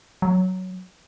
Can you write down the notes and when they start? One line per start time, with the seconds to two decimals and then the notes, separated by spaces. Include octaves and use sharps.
0.22 F#3